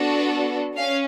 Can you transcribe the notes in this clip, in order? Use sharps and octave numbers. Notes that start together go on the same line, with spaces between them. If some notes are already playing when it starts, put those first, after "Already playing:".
Already playing: B3 D4 F#4 A4
C#4 F5